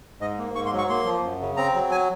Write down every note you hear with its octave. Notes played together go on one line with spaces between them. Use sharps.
G#2 D#5
A#3
G#2 C#6
C6
F#3
C#6
A#3 C6
F3
F#2
C#3
C4 A#5
F#3
G#5